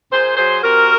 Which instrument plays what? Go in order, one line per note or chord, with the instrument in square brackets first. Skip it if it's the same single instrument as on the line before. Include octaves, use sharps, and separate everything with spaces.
[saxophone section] A#2 G#4 C5
F#3 G#4 C5
C3 F#4 A#4